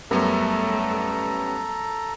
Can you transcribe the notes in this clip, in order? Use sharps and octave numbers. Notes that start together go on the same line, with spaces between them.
F#2 G3 A3 B3 C#4 A4 A#5